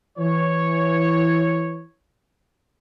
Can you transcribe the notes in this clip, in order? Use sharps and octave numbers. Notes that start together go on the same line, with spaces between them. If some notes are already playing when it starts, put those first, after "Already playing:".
E3 C#5